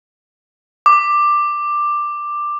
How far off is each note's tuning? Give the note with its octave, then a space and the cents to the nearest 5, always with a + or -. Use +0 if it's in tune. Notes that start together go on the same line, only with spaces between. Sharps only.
D6 +10